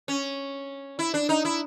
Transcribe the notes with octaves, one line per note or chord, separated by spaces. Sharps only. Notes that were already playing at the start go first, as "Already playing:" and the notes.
C#4
E4
D4
D#4
E4